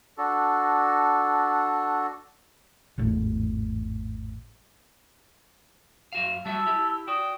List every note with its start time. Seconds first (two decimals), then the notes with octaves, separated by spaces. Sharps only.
0.18 D4 F#4 A4
2.98 G#1 E2 A2
6.13 F#2 F#4 F5
6.45 G3 F#4 E5 A5 E6
6.67 E4 G4
7.08 F#4 D5 G5 D#6